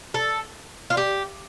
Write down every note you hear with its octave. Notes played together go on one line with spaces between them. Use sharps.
A4
F4
G4